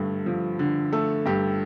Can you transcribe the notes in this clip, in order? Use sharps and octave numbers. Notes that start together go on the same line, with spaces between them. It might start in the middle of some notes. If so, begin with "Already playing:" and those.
Already playing: G2 D3 A3
F3
D3
A3 A4
G2 G4